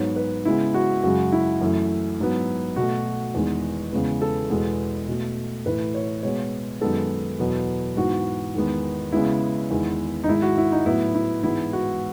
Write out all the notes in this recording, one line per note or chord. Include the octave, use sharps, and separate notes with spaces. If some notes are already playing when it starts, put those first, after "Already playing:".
Already playing: G#2 F#3 B3 C#5
B4
C#3 G#3 B3 E4
F#4
F#2 C#3 G#3 F#4
E4
F#2 E3 A3
G#2 F#3 B3
B2 A3 F#4
E2 D#3 G#3 B3
E2 C#3 G#3 B3
A4
E2 B2 G#3 B3
B2 A3
A2 E3 A3 B4
C#5
B2 G#3 B3 C#5
F#2 D#3 G#3 B3 A4
E2 B2 F#3 B3
G#2 E3 B3 F#4
E2 D#3 G#3 B3
C#3 G#3 B3 E4
E2 D#3 G#3 B3
D#4
G#2 D#3 G#3 E4
F#4
E4
D#4
A2 F#3 B3 E4
E4
G#2 E3 G#3 B3 E4
F#4